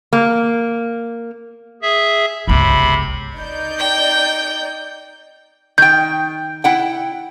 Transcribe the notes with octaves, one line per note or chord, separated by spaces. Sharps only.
A#3
G#4 E5
G1 C#2 C3 B5
D#4 D5 G6
G5
D#3 G5 G6
E4 F#5 G5